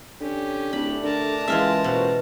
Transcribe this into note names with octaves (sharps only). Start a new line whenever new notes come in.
D3 C#4 G4
D1 A3 D4 B5
D3 A#4 A5
C#2 E3 G#3 F4 E5
B2 A#3 F#4 C5